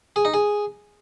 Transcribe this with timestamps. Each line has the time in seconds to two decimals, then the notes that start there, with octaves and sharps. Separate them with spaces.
0.16 G#4
0.25 D#4
0.34 G#4